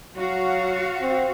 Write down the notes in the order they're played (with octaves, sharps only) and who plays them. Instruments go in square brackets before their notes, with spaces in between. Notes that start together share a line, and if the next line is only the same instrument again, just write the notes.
[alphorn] F#3 [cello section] F#4 F5
[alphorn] C4